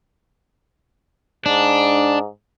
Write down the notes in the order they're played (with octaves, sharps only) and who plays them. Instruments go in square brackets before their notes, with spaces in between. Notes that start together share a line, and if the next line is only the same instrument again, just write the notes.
[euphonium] G#2 [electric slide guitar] D4